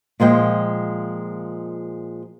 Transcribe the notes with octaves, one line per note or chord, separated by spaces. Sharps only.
A#2 F3 G#3 G5